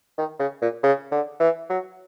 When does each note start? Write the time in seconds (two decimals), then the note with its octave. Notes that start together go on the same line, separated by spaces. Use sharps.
0.18 D#3
0.40 C#3
0.62 A#2
0.83 C#3
1.12 D3
1.40 E3
1.70 F#3